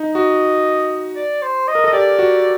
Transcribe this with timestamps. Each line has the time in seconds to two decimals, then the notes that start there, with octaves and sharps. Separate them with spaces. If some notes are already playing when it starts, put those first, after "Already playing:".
Already playing: D#4
0.14 F#4 D#5
1.16 D5
1.42 C5
1.68 D#5
1.75 A#4
1.84 A4 D#5
1.93 G4 D5
2.19 F#4